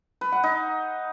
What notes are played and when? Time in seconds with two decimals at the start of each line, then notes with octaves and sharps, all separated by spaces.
0.21 B4
0.32 F#5
0.43 D#4